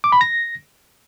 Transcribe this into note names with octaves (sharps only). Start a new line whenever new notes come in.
D6
B5
A#6